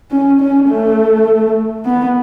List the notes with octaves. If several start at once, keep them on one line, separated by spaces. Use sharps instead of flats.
C#4
C#4
A3
B3